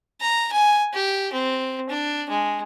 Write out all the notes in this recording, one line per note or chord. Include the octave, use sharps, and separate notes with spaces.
A#5
G#5
G4
C4
D4
G#3